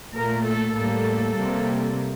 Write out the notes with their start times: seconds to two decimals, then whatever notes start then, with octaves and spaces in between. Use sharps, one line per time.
0.15 A#2 A3 A#4
0.45 A4
0.75 A2 G3 A#3 A4
1.36 C3 G3 A#3